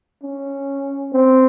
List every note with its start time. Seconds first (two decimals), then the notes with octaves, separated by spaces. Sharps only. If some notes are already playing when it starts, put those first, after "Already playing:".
0.23 C#4
1.13 C4